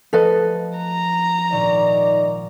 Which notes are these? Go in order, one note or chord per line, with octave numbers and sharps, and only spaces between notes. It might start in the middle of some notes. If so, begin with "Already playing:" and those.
F3 A3 A4 B4 D#5 B5
A#5
G#1 A#2 D#3 D#4 D5 C#6